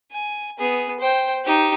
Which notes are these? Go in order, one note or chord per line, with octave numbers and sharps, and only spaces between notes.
G#5
B3 G#4
C5 G5
D#4 G4